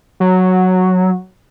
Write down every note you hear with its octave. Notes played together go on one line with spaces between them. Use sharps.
F#3